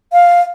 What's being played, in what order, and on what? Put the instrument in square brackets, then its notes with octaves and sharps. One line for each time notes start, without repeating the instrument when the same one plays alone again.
[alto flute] F5